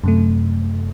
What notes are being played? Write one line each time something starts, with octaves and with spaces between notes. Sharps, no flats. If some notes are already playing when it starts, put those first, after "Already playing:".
F#2 C3 A3